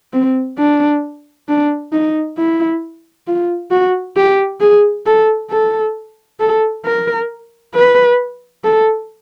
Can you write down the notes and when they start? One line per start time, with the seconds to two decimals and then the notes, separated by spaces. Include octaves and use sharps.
0.13 C4
0.58 D4
1.48 D4
1.92 D#4
2.37 E4
3.27 F4
3.71 F#4
4.16 G4
4.60 G#4
5.06 A4
5.50 A4
6.40 A4
6.85 A#4
7.74 B4
8.64 A4